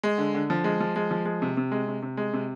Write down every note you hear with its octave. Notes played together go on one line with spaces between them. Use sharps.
G#3
D3
D3
F3
G#3
F3
G#3
F3
G#3
C3
C3
G#3
C3
C3
G#3
C3